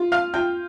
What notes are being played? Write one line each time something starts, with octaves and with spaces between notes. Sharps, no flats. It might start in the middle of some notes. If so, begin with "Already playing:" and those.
Already playing: F4
F5 F6
F4 G5 G6